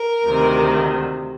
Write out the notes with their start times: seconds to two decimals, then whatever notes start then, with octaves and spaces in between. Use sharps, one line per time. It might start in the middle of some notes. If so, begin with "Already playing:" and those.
Already playing: A#4
0.25 D2 C3 D#3